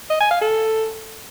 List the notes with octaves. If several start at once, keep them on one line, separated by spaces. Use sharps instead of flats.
D#5
G#5
F5
A4